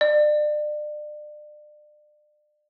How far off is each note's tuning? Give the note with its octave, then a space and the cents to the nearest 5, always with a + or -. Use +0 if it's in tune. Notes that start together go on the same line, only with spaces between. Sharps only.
D5 +35